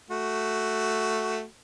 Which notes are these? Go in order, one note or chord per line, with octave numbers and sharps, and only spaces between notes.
A3 F#4